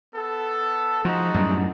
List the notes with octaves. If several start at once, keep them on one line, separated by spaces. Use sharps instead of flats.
B3 A4
F3 G#3 D#4 F#4
F#2 A2 G3